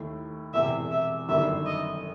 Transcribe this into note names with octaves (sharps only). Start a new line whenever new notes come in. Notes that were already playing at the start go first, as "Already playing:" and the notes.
Already playing: D#2 D#3 A3 E4
E1 E2 C3 E5
E5
G1 F#2 D#3 G3 E5
D#5